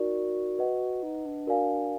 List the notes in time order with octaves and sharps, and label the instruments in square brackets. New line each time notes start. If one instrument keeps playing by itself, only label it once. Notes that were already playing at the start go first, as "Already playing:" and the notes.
Already playing: [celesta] D#4 A#4 D5 [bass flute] F#4
[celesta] B4 D#5 F#5
[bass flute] D#4
D4
[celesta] F#4 A#4 D5 F5 G#5